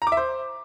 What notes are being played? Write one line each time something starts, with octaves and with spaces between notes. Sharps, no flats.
A#5
D6
E5
C5